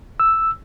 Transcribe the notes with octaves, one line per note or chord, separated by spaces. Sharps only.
E6